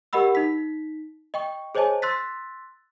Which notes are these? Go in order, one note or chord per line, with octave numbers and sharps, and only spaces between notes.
G4 A#4 D#5 F#5 B5 E6
D#4 B6
D#5 G5 C#6
G#4 C5 C#5 D#5 G#5 A5
C6 E6 F#6 A6 B6